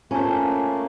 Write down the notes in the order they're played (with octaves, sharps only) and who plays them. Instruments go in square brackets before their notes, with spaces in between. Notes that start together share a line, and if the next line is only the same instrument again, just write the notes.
[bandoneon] A3 A#3 [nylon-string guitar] C#4 C5 [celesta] F4 G#5 A5